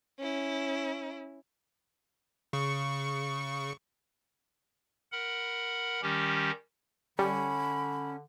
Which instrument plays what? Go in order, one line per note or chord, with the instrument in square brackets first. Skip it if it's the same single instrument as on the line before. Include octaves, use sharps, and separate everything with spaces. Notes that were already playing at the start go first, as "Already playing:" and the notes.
[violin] C#4 E4
[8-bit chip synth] C#3 C#6 C#7
[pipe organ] A#4 F#5 B5
D#3 G3 C#4 G4
[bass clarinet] D3 [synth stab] G3 [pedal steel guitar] C#4 [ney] B5